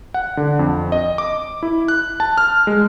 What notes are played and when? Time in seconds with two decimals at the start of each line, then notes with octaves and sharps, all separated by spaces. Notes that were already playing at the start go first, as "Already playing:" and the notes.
0.14 F#5
0.37 D3
0.59 F2
0.92 D#5
1.18 D6
1.63 E4
1.88 F#6
2.20 A5
2.38 F6
2.67 G#3